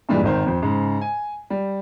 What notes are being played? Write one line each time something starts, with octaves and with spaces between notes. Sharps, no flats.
G2 A#2 E3 G3 G#3
G#1 D#3 C5
F2 C5
G#2 C#3
G#5
G3